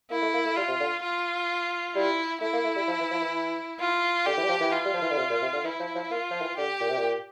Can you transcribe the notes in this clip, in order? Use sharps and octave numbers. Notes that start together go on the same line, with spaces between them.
A#3 E4
A3
A#3
A3
G3 F4
C3
D3
F4
G3 E4
A3 E4
A#3
A3
G3
F3
E3
F3
E3
F4
D3 G4
E3
G3
F3
E3
F4
G3
F3
E3
D3
C3
A#2
C3
D3
E3 E4
F3
F3
A#3 F4
F3
E3
D3 G4
A#2
C3
A#2